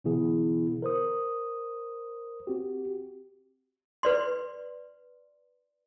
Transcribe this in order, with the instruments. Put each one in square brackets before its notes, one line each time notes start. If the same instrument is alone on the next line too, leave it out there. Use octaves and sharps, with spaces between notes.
[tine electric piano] B2 D3 E3 B3 E4 G#4
A#4 C5 D#6
C4 F#4 G4
[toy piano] B4 D5 C6